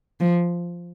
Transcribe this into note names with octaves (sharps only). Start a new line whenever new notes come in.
F3